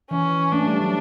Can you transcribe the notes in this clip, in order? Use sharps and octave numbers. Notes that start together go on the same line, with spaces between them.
E3 C#4
A3 D4
G3
F#3